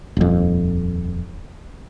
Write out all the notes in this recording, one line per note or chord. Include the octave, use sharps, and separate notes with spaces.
D#1 F2